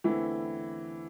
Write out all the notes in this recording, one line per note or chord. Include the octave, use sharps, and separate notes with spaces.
E2 D3 E3 A3 C4 E4